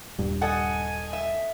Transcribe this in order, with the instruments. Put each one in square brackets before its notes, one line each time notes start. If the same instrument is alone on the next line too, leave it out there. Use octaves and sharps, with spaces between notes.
[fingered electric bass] D#1 G2
[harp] A4 D#5 [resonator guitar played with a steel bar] F#5 [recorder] G#5
[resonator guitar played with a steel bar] E5